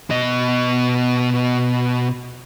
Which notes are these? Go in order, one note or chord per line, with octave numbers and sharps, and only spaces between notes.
B2 D#5